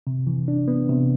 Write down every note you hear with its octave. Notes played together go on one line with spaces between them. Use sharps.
C3
E3
D4
B3
C3